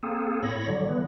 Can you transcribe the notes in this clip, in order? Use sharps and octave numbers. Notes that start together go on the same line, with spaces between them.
A#3 C4 G#4 A4
A2 C#5 B5 A#6
D3 F#3 G3
E3 B3